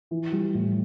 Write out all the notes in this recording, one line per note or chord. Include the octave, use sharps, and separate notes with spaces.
E3
G3
A2